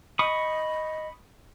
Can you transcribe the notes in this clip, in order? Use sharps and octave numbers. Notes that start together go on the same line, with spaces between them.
D#5 B5 C#6 D#6